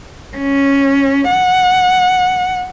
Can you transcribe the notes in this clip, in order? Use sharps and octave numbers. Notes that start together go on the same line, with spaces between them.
C#4
F#5